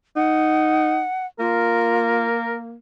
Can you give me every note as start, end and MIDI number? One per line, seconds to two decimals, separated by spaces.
0.16 1.03 63
0.16 1.26 78
1.39 2.74 58
1.39 2.26 65
1.39 2.60 70